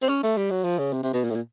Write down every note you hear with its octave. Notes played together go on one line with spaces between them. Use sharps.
C4
C#4
A3
G3
F#3
F3
C#3
C3
C3
B2
A#2
A2
A#2